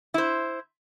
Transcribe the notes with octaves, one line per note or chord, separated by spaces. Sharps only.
E4 C5